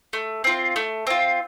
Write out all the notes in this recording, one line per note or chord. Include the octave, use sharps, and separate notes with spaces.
A3
C4 F4
A3
C4 F4